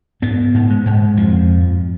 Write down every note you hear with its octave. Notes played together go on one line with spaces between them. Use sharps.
G#2 B3
G#2
G#3
G#2
F2 F3